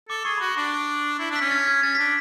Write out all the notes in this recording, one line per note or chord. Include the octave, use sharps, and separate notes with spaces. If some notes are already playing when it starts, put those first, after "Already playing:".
A4 D6
G#4 C#6
F#4 B5
C#6
D4
E4
D4 B6
C#4
A6
G#6
C#4 A6
D4 B6